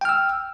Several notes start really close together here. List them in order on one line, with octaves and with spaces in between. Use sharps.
G5 F6 E6